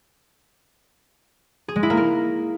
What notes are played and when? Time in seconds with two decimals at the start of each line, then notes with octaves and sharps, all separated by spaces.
1.68 G#4
1.76 G#3
1.83 E4
1.90 A#3
1.97 A#4